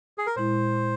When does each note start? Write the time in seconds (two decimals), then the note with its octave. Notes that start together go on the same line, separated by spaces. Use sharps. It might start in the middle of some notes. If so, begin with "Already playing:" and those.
0.18 G#4
0.26 A#4
0.36 A#2 G#3 E4 C5